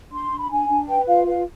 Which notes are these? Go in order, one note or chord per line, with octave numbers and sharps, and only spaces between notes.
D4 C6
D4
B5
D4 G#5
D4
B4 G5
F4 F5
B4 F5